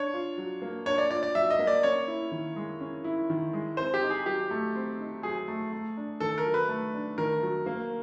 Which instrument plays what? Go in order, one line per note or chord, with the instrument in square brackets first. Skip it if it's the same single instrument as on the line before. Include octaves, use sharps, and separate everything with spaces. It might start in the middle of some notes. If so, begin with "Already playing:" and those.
Already playing: [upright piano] D4 [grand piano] C#5
[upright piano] F4
F#3
A#3
[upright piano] D4 [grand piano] C#5
[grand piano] D5
[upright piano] F4 [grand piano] D5
[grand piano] D5
[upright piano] F#3 [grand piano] E5
[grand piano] D#5
[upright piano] A#3
[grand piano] D5
[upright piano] C#4 [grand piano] C#5
[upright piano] E4
D#3
G#3
C#4
E4
D#3
G#3
[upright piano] C4 [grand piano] C5
[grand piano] G4
[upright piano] D#4
[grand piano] G#4
[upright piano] F#3 [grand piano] G4
[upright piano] A3
C4
D#4
[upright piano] F#3 [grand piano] G#4
[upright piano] A3
A3
D4
[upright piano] D#3 [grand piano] A4
[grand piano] A#4
[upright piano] F#3
[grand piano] B4
[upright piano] A3
D4
[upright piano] D#3 [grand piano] A#4
[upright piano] F#3
A#3